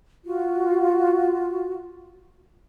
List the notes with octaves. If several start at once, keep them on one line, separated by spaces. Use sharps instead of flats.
F4 F#4